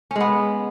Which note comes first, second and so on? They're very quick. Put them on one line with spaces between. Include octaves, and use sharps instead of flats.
C#4 G#3 B3